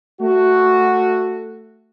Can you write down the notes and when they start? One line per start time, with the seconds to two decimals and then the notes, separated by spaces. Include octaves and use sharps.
0.21 A3 F#4